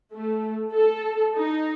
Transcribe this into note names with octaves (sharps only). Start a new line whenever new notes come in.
A3
A4
D#4